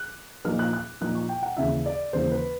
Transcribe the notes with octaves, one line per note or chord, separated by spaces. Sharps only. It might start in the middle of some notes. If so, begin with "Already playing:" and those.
Already playing: F#6
A#2 F3 A#3 D#4 F6
F#6
F#6
A#2 F3 A#3 D#4 F#6
C#6
G5
F#5
D#2 C#3 E3 E5
D5
D#2 C#3 E3 C5
B4